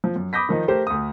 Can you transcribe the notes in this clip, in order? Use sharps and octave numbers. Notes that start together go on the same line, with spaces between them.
F3
F#2
B5 D6 D#6 G6 A#6 B6
D#3 F3 D#4
A3 G4 A#4 C5
D2 D#6